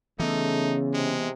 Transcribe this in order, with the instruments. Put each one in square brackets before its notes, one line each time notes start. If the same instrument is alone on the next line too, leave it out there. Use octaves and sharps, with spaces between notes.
[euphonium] C#3 [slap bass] E3 B3 [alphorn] A3 [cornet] D#4
[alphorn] C3 [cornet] G#3